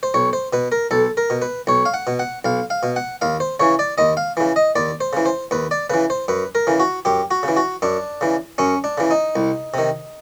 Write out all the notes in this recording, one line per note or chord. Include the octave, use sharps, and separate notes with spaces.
C5
B1 C#5
C5
B2 B4
A#4
B1 A4
A#4
B2
B4
B1 C#5
F5
F#5
B2
F#5
B1 F5
F5
B2
F#5
D#2 F5
C5
C#3 E3 C#5
D5
D#2 D#5
F5
C#3 E3
D#5
D#2 D5
C5
C#3 E3
C5
D#2 B4
D5
C#3 E3 B4
C5
F#2 B4
A#4
C#3 E3
F#4
F#2 G4
F#4
C#3 E3
F#4
F#2 D4
C#3 E3
F#2 C#4
D4
C#3 E3
D#4
C2
C3 D#3